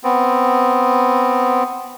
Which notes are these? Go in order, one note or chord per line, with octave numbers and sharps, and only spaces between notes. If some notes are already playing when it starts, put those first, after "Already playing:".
B3 C4